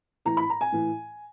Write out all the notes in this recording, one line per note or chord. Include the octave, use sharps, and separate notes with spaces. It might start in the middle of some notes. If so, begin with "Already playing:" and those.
A2 E3 A#5
B5
A#5
G#5
A2 E3